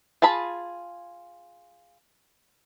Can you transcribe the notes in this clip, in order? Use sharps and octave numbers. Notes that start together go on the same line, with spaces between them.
F4 G#4 A5 B5